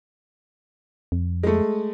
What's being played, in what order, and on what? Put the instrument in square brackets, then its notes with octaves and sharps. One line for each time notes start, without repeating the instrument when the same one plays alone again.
[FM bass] F2
[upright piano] G#3 A3